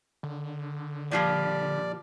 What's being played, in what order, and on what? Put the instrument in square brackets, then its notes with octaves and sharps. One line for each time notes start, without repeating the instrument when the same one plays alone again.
[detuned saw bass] D3
[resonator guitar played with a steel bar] A#2 F3 G3 [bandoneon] D5